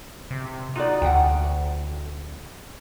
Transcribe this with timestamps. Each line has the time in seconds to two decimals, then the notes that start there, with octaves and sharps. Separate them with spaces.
0.30 C3
0.75 D#4 F4 F#4 D5
1.02 D2 F#5 G5